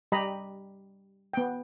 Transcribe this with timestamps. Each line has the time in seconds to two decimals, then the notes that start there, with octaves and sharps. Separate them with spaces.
0.12 G3 G4 D#5 A#5 B5
1.33 B3 G5